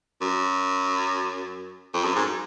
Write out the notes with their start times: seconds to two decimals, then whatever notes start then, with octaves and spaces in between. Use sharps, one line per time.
0.21 F#2
1.94 F2
2.04 F#2
2.15 G#2